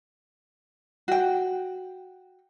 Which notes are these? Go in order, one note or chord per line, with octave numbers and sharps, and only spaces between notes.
F#4 G5